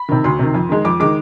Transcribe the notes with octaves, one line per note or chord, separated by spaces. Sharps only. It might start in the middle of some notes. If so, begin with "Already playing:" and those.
Already playing: B5
C3 D#3
D2 C6
C3 D#3
F2
D#3 G#3
F2 D6
D#3 G#3 D6